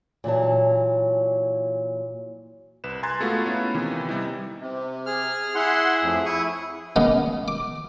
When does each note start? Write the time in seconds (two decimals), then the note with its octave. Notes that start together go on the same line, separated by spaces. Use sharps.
0.24 A#2 E3 F#3 A5
2.84 C2 B4 E7
3.03 G#5 A#5 C6 F#6 G#6 A6
3.20 G#3 A3 B3 F4 F#4
3.46 B3 C#4 E4 F4
3.74 C3 D#3 E3
4.09 C3 G3 B3 D#4 E4
4.60 C3
5.06 G#4 F6
5.55 E4 G#4 F#5 C6
6.02 F2 A2
6.26 E4 C#6 D#6
6.96 C#3 G#3 A#3 B3
7.48 D6